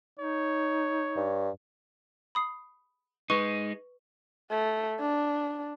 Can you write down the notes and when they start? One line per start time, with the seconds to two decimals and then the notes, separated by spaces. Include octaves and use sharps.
0.19 D#4 C#5
1.16 G2
2.35 B5 D#6 C7
3.30 G#3 D#4 B4 C#6
4.50 A3
5.00 D4